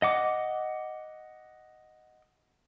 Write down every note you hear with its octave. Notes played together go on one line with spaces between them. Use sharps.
D#5 F#5 D6